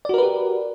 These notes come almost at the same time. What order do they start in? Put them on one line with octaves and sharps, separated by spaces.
D5 F#4 A#4 B4 G4